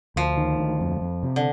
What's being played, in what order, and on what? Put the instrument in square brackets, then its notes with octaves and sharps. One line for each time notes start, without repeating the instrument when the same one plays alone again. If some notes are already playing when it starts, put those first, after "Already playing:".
[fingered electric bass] D2 [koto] F3
[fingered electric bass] D#3
D2
F2
F2
C3
[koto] D3